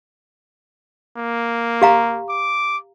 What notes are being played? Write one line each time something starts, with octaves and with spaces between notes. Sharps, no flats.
A#3
G4 F5 A#5
D6